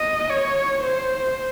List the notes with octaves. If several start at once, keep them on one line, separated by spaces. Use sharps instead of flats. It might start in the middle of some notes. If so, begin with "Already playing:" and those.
Already playing: D#5
C#5
C5